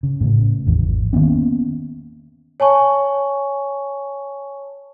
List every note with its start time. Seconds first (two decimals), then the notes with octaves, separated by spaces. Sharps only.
0.03 C#3
0.21 A2 C#3
0.66 G#1 E2
1.13 D#3 A#3 B3 C#4
2.60 C#5 G#5 A5 C#6